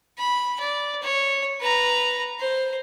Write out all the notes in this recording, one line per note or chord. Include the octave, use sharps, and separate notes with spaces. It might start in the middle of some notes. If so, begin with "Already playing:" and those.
B5
D5
C#5
B4 A#5
C5